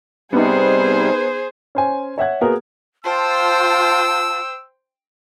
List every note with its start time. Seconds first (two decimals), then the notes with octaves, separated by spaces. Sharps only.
0.33 C3 G3 B3 D#4 G#4 C5
1.75 C#4 C5 G#5
2.18 C#5 E5 F#5 G#6
2.41 A#3 B3 F#4 G#4 A#4
3.04 F4 C5 G5 A5 E6